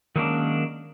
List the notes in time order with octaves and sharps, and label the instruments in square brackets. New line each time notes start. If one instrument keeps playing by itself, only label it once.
[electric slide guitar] D#3 F#3 G#3 A#3 C#4 D4